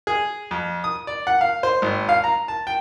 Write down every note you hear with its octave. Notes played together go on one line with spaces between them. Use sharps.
G#4
F2
D#6
D5
F#5
F5
C5
G#1
F5
A#5
A5
G5